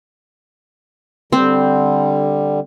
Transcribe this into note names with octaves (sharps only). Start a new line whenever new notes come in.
D3 G3 C4